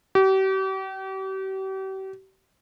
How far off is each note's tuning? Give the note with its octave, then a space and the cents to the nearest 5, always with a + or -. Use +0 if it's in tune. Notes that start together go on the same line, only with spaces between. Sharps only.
G4 -40